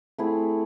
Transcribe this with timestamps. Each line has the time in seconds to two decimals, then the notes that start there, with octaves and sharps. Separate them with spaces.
0.18 A3 C4 E4 G#4